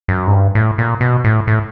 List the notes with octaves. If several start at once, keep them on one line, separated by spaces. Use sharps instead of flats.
F#2
G#2
G2
A2
A#2
B2
A2
A2